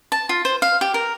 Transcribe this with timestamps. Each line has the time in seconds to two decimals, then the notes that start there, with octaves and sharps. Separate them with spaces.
0.12 A5
0.29 F4
0.45 C5
0.62 F5
0.81 G4
0.94 A#4